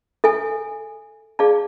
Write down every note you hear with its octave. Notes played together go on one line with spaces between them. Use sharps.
A4 E5 G#5
G#4 D5 F5 A5